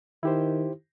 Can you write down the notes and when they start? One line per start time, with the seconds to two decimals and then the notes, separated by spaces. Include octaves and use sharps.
0.23 D#3 E4 G4 C5